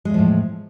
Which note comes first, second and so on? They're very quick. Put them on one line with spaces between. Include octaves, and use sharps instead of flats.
G#3 E2 F3 A2